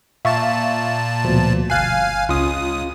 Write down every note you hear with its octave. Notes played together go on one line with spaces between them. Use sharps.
A#2 E5 F5 A5 C#6
D2 B2 F3
G1 F5 G#5 F#6 C7
C#2 C#4 F4 D#6